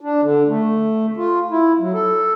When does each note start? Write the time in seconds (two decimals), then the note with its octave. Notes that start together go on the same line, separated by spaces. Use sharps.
0.01 D4
0.23 D3
0.48 A3
1.17 F4
1.51 E4
1.80 F#3
1.93 A4